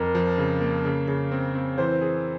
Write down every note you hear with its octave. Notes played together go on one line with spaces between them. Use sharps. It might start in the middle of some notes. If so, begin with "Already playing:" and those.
Already playing: F2 A#4
F3
C#3
A#3
C#3
C#3
C4
C4
E3 C5
G#4